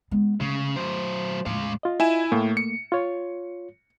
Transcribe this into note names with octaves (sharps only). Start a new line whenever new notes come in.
G#3 B3
C#3 A3
F#3 C5
E2 A2 G#3 F5
F4 D#5
E4 G#5 E7
A2 A3 A#3
C#7
F4 C#5